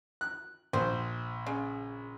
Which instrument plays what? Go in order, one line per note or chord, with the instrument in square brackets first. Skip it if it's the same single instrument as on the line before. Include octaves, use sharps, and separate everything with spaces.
[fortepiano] F#6
[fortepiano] A#1 [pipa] C5
[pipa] C#3